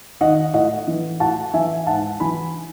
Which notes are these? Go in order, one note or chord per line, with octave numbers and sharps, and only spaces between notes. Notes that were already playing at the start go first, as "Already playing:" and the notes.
D#3 D#5 F#5
A2 D#5 F#5
E3
A2 F#5 A5
E3 E5 G#5
G#2 F#5 A5
E3 G#5 B5